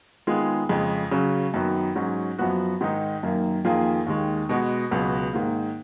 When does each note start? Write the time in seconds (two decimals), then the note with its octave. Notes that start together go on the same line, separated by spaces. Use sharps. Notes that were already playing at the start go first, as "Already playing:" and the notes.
0.27 D#3 G#3 B3 F4 G#4
0.69 F2 C#3 G#3
1.11 C#3 F#3 C#4
1.54 F#2 D#3 F#3 B3
1.95 G#2 F#3 C#4
2.38 F#2 F3 B3 F#4
2.81 G#2 D#3 G#3 D#4
3.23 F#2 D#3 A#3
3.65 F2 D#3 A#3 F4 G#4
4.07 D#2 D#3 G#3
4.49 B2 G#3 B3 F#4
4.91 C#2 B2 F#3 B3 F#4
5.33 G#2 D#3 A#3